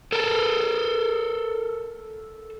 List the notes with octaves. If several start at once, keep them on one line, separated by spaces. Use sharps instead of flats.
A4 A#4